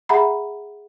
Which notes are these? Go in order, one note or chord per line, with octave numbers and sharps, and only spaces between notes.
G#4 E5 F#5 A#5 B5